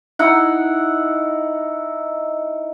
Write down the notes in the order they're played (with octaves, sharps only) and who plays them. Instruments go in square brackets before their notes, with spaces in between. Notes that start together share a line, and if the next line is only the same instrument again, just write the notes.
[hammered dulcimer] D#4 E4 F#5